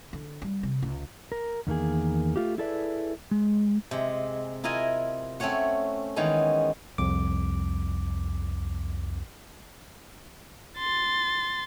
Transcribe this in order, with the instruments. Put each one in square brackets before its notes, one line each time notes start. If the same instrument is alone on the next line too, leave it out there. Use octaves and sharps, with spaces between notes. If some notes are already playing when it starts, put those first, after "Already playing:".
[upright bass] D3
G3
C3
C#2
[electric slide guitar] A#4
E2 D#3 A#3 G#4
A3 F4 G4
E4 G#4 A4 B4 D5 E5
G#3
[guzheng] C3 G#3
E4 F4 A#4 D#5 G#5
A3 C4 C#4 C#5 F#5
D#3 E3 G#3 B3 C#4
[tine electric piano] C2 F2 D6
[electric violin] C6 A6